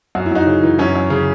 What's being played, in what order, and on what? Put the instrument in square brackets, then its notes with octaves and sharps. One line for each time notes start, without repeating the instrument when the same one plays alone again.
[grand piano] F#2 F#4
E4
F#2 D#4 F#4
C#3
E3
F#2 C#4 E4
F#2
C#3